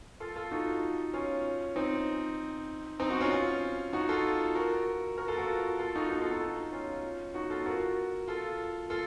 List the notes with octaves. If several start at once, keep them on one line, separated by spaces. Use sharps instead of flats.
F4 A4
F4 A4
D#4 F#4
C#4 F4
C4 D#4
C4 D#4
D#4 F#4
C#4 F4
C#4 F4
D#4 F#4
F4 A4
F#4 A#4
F#4 A#4
F4 A4
F#4 A#4
F4 A4
D#4 F#4
D#4 F#4
F4 A4
D#4 F#4
C#4 F4
D#4 F#4
F4 A4
F#4 A#4
F4 A4
F4 A4